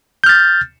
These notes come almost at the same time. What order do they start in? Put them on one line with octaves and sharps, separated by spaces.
G6 F6 A6